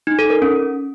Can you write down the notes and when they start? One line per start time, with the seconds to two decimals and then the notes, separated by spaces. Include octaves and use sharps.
0.07 D#4
0.19 A4
0.30 A#4
0.42 C#4